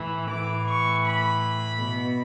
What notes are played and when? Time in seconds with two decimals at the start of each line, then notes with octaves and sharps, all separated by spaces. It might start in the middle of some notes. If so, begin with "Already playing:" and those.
Already playing: A2 E3
0.30 A2 E3 D6
0.68 C#6
1.07 B5
1.84 B2